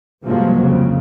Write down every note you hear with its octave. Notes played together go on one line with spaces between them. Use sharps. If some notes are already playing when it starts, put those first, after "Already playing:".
C2 G2 F3 F#3 G#3 A#3
F2 C#3